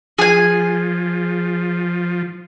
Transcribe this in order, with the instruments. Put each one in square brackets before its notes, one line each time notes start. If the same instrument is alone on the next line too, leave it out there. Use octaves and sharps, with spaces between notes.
[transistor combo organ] F3 [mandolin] G#4 G#5